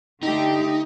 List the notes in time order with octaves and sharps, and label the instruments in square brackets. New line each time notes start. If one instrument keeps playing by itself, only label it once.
[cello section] D3 A3 G4 [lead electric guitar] D#4